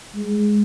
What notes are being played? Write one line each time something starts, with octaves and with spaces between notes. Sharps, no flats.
G#3